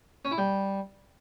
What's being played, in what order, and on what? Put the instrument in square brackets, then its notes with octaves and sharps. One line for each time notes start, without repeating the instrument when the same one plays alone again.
[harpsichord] C#4
E4
G3